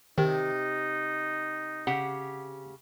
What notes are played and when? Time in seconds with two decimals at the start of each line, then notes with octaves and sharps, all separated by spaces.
0.18 C3 D#3 D#4
1.87 C#3 G4 F#5